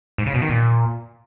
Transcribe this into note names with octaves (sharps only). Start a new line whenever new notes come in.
G#2
C#3
B2
D#3
A#2